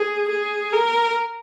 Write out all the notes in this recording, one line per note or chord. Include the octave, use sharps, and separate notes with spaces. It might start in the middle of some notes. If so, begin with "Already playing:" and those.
Already playing: G#4
G#4
A#4